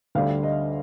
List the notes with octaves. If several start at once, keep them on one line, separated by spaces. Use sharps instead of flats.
D2 D3 G3 F5
D#5